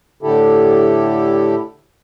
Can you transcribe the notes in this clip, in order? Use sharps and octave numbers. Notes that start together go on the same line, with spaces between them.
A2 D3 E4 G4 A4